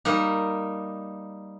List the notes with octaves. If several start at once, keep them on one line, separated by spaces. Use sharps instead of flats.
G3 A#3 D#4